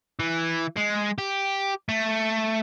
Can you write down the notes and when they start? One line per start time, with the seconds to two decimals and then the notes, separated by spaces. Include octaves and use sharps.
0.19 E3
0.77 G#3
1.18 G4
1.89 A3